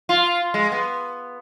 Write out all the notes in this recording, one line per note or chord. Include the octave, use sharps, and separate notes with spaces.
F4
G#3
B3